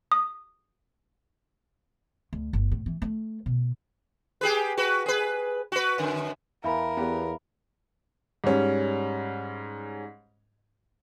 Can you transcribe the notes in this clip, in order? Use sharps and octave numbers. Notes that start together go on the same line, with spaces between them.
D#6
D2
G1
A2
E3
A3
B2
G4 G#4 B4
F#4 B4
G#4 B4
F#4 B4
F#2 D3
E2 A#4 E5 F5 B5
E2 B3 G4
G#2 G3 C#4